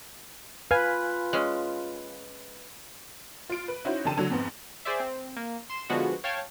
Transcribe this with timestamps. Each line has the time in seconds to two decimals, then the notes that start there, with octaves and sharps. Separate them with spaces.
0.71 F4 B4 F5 G#5
1.33 G#3 C#4
3.50 F4 D7
3.68 B4
3.85 C#4 D#4 E4 F#4 C5
4.05 F1 F#2 D3 G5 A5 D#7
4.17 D3 F#3 A3 A5
4.30 F2 G#2 B3
4.85 G#4 C5 D5 E5
5.00 C4
5.36 A#3
5.70 C6 E7
5.90 D3 F3 G#3 B3 F#4
6.24 C#5 F5 G5 A5 F6 G#6